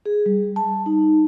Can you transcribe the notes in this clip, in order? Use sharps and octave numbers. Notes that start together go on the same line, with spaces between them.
G#4
G3
A5
D#4